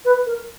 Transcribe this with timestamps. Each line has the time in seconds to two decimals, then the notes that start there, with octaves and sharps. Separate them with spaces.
0.05 B4
0.26 A#4